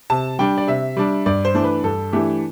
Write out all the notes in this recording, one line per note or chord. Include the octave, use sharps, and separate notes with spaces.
C3 A5
G3 D4 G5
D5
C3 E5
G3 D4
G2 D5
C5
E3 A3 D4
B4
G2 A4
E3 A3 D4 G4